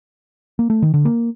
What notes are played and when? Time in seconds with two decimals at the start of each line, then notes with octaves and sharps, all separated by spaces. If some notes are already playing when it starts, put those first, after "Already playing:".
0.59 A#3
0.70 A3
0.82 D#3
0.94 D3
1.05 A#3